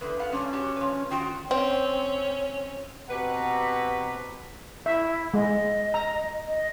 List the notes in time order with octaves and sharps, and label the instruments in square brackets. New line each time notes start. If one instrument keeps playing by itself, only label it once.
[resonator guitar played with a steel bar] E2 D3 [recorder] B4
[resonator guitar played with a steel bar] B3 F5 F#5
[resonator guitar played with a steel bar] F3 G3 D4 [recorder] C#4
[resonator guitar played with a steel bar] D4 F#4 G4
F3 B4
[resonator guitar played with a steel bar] D#3 F4 F#4 [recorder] G5
[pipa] C4 [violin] C#4
[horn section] B2 C4 G4 B4 F#5 A#5
[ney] E4 [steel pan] E5
[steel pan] G#3 [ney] D#5
[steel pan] A#5
[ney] D#5